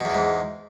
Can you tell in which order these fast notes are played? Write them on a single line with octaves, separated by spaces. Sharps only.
B2 E2 E3 G#2